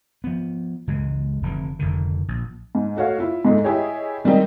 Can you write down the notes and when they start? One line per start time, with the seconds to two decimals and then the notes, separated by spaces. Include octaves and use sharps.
0.24 F3 B3
0.87 C#2 E3 G#3
1.43 F1 D3 E3
1.79 F1 F2 D3 D#3
2.28 A#1
2.75 G#2
2.96 A3 F#4 C#5 F5
3.19 E4 F4
3.45 G#2 G#3 A3
3.64 E4 G4 G#4 C#5 D#5
4.24 D#3 G3 G#3 C4 D#4